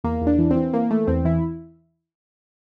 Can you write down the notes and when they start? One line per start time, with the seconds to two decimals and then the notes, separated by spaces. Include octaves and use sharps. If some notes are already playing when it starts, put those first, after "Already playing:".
0.04 E2 A#3
0.21 E2
0.27 D4
0.39 E3
0.51 C4
0.56 E3
0.73 E3 A#3
0.90 E3 A3
1.07 E2 C4
1.25 E3 E4